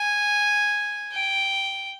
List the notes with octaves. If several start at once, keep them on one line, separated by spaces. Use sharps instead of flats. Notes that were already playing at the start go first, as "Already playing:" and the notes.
Already playing: G#5
G5